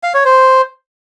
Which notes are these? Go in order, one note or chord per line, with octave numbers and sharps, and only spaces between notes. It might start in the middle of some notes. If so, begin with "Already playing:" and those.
F5
C#5
C5